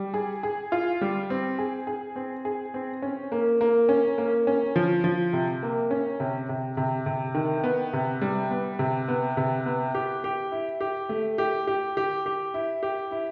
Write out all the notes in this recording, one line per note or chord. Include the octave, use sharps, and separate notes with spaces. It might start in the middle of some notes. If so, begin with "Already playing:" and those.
Already playing: G3
G#4
G#4
F4
G3
C4
G#4
G#4
C4
G#4
C4
C#4
A#3
A#3
C#4
A#3
C#4
F3
F3
C3
A#3
C#4
C3
C3
C3
C3
D#3
B3
C3
G3
B3
C3
B3
C3
B3
G4
G4
E4
G4
A3
G4
G4
G4
G4
E4
G4
E4